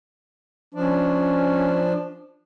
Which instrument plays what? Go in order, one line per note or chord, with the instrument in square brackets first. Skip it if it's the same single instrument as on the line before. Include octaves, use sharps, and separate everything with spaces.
[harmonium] F3 D4 [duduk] C#4